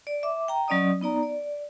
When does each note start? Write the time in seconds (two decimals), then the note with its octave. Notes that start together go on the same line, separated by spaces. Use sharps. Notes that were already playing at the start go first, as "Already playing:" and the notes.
0.07 D5
0.23 E5 D6
0.48 G5 A#5
0.68 F#3 C#4 D5 D#5 D#6
1.01 B3 D#4 D5 A#5
1.23 D5